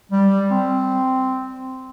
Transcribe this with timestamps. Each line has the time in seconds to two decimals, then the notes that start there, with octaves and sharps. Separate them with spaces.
0.12 G3
0.51 C4